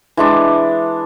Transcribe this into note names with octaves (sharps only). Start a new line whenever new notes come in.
E3 G#3 D4